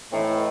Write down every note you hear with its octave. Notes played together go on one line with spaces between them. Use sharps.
A2 E3 C4 D#4